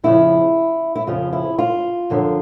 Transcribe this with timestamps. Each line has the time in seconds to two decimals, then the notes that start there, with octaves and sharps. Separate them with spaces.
0.04 F2 C#3 F3 E4
0.95 E4
1.07 F2 C#3 F3 F4
1.33 E4
1.59 F4
2.10 F#2 D3 F3